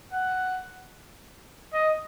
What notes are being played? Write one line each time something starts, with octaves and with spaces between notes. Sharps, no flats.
F#5
D#5